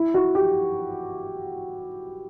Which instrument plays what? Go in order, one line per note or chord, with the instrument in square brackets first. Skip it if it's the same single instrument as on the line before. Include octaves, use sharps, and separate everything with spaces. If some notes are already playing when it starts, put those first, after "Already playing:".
Already playing: [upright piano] E4
F#4
G4